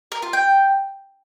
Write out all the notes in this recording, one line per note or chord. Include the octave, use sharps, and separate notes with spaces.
A#4
F4
G5